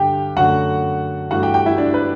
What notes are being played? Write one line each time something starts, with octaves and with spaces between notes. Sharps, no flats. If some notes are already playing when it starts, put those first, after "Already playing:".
Already playing: G2 D3 G4 G5
F#2 D3 A3 F#4 F#5
G2 E3 A3 F#4 F#5
G4 G5
G4 G5
E4 E5
D4 D5
B4